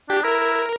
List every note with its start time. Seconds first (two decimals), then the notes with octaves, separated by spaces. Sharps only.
0.09 D4 G4
0.24 E4 A#4